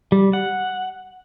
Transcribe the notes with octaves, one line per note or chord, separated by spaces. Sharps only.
G3
F#5